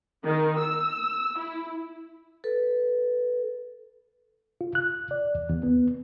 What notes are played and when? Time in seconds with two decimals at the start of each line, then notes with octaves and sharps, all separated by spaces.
0.24 D#3
0.59 E6
1.39 E4
2.44 A4 B4
4.61 F4
4.75 F#6
5.11 D5
5.35 E2
5.50 E2
5.63 B3